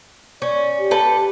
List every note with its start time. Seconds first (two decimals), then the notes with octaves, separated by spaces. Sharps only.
0.42 C#4 D5
0.80 G4
0.91 A4 B4